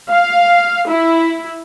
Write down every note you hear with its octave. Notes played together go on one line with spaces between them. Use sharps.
F5
E4